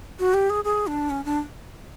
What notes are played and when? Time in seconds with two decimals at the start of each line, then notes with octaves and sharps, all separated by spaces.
0.19 F#4
0.34 G4
0.50 G#4
0.64 G#4
0.87 D4
1.10 C#4
1.25 D4